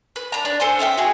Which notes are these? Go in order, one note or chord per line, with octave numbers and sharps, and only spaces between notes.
B4
D4 A#5
D4
A4 C5 G#5 C6
C#4 D#5 E5 G5
F#4 G#4